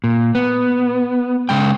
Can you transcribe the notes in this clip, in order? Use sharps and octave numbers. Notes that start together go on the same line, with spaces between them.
A#2
B3
C#3 G#3 G5